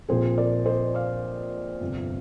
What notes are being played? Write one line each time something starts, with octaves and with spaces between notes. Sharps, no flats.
A#1 A#2 F3 C4 G#4 C5
A#4 D5
C5 D#5
D5 F5
G1 F2 C3